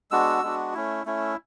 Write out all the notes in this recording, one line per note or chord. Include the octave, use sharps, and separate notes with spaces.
G#3 B3 D4 F#4 E6
G#3 B3 D4 F#4
A3 C#4 E4
A3 C#4 E4